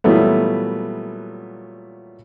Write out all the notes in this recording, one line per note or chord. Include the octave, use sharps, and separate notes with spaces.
A#2 E3 F#3 G3 A3 B3